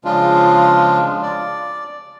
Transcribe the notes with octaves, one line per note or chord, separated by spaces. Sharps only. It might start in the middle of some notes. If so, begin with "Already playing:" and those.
C#3 F3 G#3 D4 F4
D5